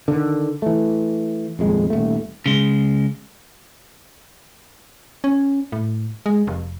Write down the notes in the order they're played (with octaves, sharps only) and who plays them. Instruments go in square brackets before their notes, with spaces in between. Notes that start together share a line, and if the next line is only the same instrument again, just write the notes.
[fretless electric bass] D3 D#3
E3 A3
D#1 F2 G#3
D#1 A3
[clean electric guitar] C#3 G#3
[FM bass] C#4
A2
G#3
F1